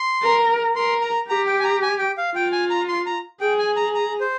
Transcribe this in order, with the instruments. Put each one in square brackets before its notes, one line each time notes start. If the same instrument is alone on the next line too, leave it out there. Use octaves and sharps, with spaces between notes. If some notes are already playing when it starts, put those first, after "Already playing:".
Already playing: [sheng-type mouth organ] C6
[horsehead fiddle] A#4
[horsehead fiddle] A#4 [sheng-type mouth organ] C6
[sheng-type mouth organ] A#5
[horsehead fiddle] G4 [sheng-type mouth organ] A#5
[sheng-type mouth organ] G5
G#5
A#5
G#5
G5
F5
[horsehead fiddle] F4 [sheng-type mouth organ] G5
[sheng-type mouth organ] G#5
A#5
C6
A#5
[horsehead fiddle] G#4 [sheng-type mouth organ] G5
[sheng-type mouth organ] G#5
A#5
A#5
C5